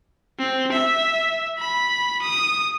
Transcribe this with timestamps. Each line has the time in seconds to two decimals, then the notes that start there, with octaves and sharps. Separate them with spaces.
0.39 C4
0.72 E5
1.58 B5
2.23 D#6